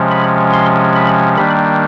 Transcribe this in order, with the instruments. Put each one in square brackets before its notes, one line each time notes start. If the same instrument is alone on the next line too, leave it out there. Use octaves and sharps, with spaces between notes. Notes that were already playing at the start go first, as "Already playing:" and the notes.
Already playing: [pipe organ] C3 F3 G#3 C#4
B5
C6
B5
D#3 G3 A#3 D4 B5